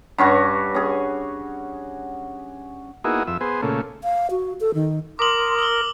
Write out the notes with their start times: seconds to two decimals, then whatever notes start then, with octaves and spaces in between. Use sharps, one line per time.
0.18 G2 C#4 F#4 C#6
0.75 C#4 G#4
3.04 A#3 B3 D#4 E4 F#4 G#4
3.27 F2 E5
3.41 B3 G#4 C5
3.62 A#2 C#3 A3
4.04 F5
4.30 F#4
4.60 A4
4.74 D#3
5.19 A#4 C6 D6 D#6 F#7
5.59 E6 G7